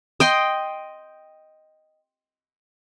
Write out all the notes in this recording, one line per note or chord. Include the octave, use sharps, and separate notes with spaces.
D#5 G5 C6